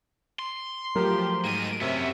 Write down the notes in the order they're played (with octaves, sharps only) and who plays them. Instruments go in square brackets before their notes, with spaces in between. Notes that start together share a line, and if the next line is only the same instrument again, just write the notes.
[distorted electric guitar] C6
[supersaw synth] F3 G4 [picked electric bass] F#3 A3 [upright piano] A#4
[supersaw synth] G#2 D#7 [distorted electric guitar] A#3 D#5
[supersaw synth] F#2 C3 E5 [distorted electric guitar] B3 C#4